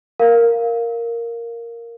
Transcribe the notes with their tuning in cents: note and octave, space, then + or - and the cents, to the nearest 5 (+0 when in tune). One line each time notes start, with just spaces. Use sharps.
A#4 +0 F5 +0